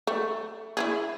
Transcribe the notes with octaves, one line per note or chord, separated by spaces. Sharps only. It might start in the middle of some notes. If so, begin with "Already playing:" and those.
A3
E4 F4 G#4